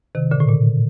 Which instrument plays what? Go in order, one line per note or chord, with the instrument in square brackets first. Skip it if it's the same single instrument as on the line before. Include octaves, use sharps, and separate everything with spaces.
[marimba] C3 D#3
A#2 D3
A2
A#2